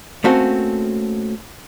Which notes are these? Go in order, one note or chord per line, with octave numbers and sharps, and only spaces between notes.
A3 A#3 C4 C#4 F#4 A4